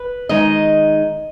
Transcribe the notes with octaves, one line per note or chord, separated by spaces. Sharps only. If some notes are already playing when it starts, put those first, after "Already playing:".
Already playing: B4
D#3 G#3 D#4 D#5